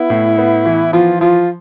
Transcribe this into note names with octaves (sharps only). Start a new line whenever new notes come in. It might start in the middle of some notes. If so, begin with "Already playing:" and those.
Already playing: B3 E4
A2
B3
E3
F3 F4
F3 F4